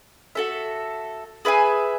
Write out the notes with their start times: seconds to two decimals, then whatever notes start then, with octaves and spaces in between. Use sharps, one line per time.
0.35 F#4 A4 E5
1.45 G#4 B4 E5 G#5